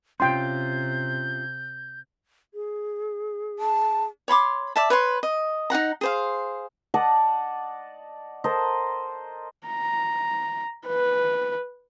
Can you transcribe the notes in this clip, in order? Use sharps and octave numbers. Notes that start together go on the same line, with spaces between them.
C3 C#4 F4 G5 C6 G6
G#4
A5
C#5 B5 C6 D6
D5 E5 A5
B4 C#5 C6
D#5
D#4 F#4 F#5 A#5
G#4 C5 F5
D5 D#5 F#5 A5
A4 A#4 C5 D#5
A#5
B4